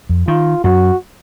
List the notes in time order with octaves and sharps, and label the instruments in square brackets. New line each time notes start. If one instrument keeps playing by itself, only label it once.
[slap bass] F2
[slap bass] D#3 [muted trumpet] F4
[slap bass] F#2 [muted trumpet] F#4